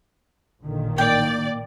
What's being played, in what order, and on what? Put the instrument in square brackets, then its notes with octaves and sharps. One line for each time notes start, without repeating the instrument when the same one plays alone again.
[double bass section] A1 A#2 D#3 [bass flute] D3
[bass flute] A#3 [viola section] D5 [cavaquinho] G5